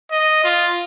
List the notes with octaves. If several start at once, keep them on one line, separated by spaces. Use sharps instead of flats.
D#5
F4